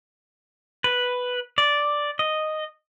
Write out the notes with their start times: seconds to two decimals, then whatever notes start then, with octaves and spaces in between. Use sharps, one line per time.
0.84 B4
1.58 D5
2.19 D#5